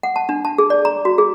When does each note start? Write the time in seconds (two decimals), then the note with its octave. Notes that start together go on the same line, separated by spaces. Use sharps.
0.03 F#5
0.16 A5
0.29 D4
0.45 A5
0.58 G#4
0.70 D5
0.85 A#5
1.05 F#4
1.18 G#4